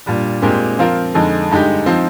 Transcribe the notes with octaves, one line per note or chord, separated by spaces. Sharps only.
A#2 G3 D4
A#2 G#3 C4 G4 A#4
F3 C4 F4 A#4
F2 D3 G#3 D#4
G2 D3 G#3 D#4 G4
F3 C4 D#4